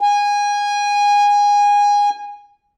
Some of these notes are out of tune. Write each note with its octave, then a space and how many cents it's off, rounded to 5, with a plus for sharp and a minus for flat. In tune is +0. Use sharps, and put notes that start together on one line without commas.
G#5 -20